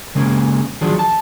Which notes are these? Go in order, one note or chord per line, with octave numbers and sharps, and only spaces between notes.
C#3 G#3 A#3 C#4
D#3 F3 F#3 D4 G#4
A5